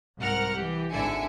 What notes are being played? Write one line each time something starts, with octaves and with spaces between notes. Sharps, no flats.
C2 G#2 A#4 F#5 F6
E3 G4
G#1 D3 E4 E5 G#5 C#7